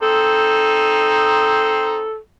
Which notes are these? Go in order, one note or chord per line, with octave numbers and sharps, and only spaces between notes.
C4 D#4 A4